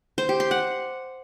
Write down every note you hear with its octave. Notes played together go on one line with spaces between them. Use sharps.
C5
G4
C6
F#5